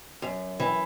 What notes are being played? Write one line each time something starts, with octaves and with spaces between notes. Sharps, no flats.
F#2
E3